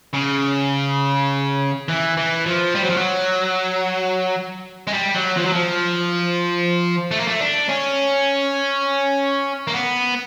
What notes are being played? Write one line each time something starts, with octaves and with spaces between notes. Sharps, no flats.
C#3
E3
E3
F3
G3
F#3
F3
F#3
G#3
G3
F#3
F3
F#3
F3
A3
A#3
A3
D4
C#4
A#3
B3